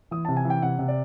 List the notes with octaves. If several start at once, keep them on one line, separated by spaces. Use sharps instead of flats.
E3 D#6
C3 A5
G#5
E3
G5
C3 F#5
C3
D5